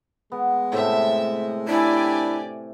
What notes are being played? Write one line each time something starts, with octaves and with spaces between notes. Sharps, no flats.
G#3 B3
A2 C3 A4 E5
D4 E4 G4 D5 G#5